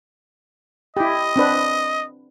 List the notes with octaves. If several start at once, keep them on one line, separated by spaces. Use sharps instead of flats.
E4 G4 D#5
C4 D4 B4